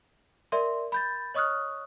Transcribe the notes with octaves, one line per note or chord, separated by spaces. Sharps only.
A#4 D5 E5 C6
B5 G6 A6
C#5 D#5 C#6 D#6 F6 F#6